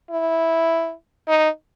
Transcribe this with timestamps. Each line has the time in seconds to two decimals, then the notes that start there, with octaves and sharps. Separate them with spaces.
0.11 E4
1.28 D#4